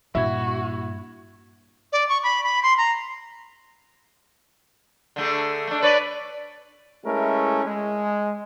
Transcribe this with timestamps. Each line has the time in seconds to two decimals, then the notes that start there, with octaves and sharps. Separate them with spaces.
0.15 G2 A#2 E4 F#4 G#6
1.93 D5
2.09 C#6
2.24 B5
2.44 B5
2.63 C6
2.78 A#5
5.16 D3 A3 G#4
5.67 A3 D4
5.82 B4 C#5 D5
7.05 G#3 A3 C#4 E4 A#4
7.65 G#3